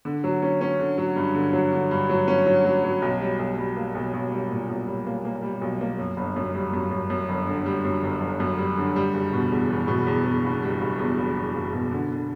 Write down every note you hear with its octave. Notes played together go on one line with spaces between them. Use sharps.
D3
F#3
C#4
C#4
D3
F#3
G2
D3
F#3
D3
G2
F#3
C#4
F#3
F#3
F#3
B1
G3
B1
G3
A#3
B1
B1
G3
A#2
B1
G3
A#3
A#3
G3
B1
A#3
F#2
G1
F#2
G3
F#2
F#2
F#2
G1
D3
G3
F#2
G1
G1
F#2
G3
D3
G3
F#1
B2
E2
E2
B2
E2
E2
F#1
G3
F#1
E2
F#1
E2
F#1
B2
D3
D3